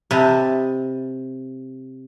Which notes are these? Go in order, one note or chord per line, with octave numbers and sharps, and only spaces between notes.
C3 B4 D#5 A5